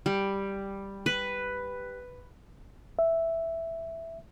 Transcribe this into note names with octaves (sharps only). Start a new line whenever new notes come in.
G3
B4
E5